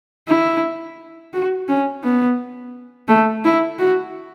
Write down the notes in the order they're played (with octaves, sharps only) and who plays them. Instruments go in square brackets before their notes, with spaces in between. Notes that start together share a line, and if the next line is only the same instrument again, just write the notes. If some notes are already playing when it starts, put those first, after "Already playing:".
[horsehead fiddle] E4
F#4
C#4
B3
A3
E4
F#4